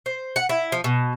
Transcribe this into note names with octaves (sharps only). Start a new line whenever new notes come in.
C5
F#5
E4
F3
B2